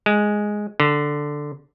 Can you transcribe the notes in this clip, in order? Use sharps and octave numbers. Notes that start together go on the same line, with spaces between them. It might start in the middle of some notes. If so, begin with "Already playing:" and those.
G#3
D3